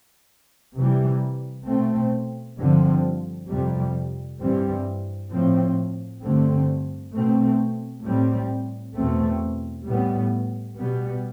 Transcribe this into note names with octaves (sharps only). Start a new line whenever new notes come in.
C3 E3 G3
B2 A3 C4
G2 D3 F3 C4
F2 C3 G3
G2 E3 G3 C4
A2 F3 C4
G2 D3 A3 C4
B2 A3 C4
A2 G3 C4
E2 B2 A3 C4
A2 G3 B3
B2 G3 B3